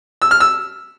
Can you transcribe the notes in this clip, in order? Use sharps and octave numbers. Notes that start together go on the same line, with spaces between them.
E6
F6
E6